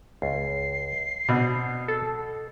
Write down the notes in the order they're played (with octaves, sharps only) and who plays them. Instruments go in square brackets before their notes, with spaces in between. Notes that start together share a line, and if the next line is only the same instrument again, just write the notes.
[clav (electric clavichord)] C#2 [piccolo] C7
[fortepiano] B2 [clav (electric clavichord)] C4 D4
[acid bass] A4